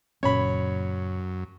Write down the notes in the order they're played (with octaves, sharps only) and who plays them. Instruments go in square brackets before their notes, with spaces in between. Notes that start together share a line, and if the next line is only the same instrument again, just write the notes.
[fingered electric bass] F#1 A#2 C#4 [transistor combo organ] F#2 [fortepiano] C#5 B5